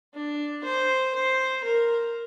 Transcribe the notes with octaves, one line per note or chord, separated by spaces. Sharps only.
D4
C5
C5
A#4